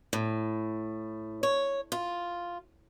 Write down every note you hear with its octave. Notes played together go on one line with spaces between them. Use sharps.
A2
C#5
F4